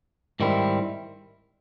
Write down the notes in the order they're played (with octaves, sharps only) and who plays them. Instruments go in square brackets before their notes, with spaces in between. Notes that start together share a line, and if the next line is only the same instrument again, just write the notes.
[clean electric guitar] G#2 D#3 G3 C4 E4